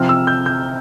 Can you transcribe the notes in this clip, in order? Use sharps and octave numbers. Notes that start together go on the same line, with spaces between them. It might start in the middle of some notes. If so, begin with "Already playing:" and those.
Already playing: C3 F3 C4 F6
E6
G6
G6